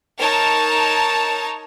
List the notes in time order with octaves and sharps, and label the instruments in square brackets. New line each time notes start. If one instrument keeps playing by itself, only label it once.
[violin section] D#4 A#4 C#5 A5